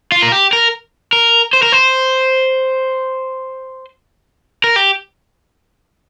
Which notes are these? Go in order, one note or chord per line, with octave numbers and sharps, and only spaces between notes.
F4
A#4
G4
A#4
A#4
C5
A#4
C5
A#4
G4